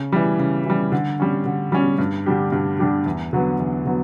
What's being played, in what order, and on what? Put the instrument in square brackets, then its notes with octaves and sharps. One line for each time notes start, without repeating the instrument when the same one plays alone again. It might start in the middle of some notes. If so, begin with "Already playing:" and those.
Already playing: [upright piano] C#3
E3 G3
C#3
E3 G3
D3
G3 C#4
D3
G3 C#4
G2
D3 G3 D4 G4
G2
D3 G3 D4 G4
E2
D3 F#3 B3
E2
D3 F#3 B3